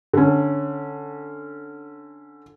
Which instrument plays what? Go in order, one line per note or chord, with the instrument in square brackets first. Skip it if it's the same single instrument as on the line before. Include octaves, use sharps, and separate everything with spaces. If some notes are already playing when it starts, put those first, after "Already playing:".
[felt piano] D3 C#4